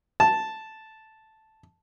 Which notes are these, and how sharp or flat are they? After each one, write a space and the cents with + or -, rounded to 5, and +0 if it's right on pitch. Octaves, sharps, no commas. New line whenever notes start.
A5 -5